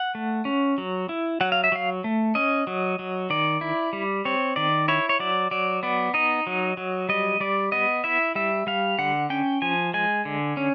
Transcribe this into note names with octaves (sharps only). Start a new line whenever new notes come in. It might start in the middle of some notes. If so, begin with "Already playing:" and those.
Already playing: F#5
A3
C#4
F#3
E4
F#3 F#5
F5
E5
F#3 F5
A3
C#4 D#5
F#3
F#3
D#3 D5
E4
G3
C4 C#5
D#3 D5
E4 C#5
C#5
F#3 D5
F#3 D5
B3 D5
D#4 D#5
F#3
F#3
G3 D#5
G3 D5
B3 D#5
E4 E5
G3 E5
G3 F5
D3 F#5
C#4 G5
F3 G#5
G#3 G#5
D3
C#4